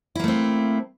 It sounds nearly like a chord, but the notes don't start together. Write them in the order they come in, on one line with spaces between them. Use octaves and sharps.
E4 A#3 A3 C4